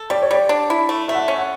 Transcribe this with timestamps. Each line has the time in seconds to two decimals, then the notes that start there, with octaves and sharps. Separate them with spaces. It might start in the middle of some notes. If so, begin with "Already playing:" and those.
Already playing: A4
0.10 G3 D5
0.22 C#5
0.31 G3 D5
0.49 D4
0.70 E4
0.89 A3
1.08 A3 E5
1.14 F#5
1.19 E5
1.28 C#4
1.38 F#5